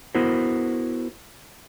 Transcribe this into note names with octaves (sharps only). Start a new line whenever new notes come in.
B3 E4 F#4 A#4 C5